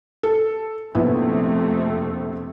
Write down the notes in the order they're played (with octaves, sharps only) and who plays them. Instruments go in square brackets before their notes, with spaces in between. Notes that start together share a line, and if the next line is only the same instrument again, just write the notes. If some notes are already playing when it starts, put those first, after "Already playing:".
[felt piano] A4
[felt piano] A#1 B3 E4 [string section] F2 C3 A3